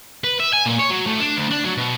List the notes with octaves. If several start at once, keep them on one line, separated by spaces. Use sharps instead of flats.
B4
E5
G#5
A#2
C#5
F#3
A2
D4
D2
D4
F#3
B2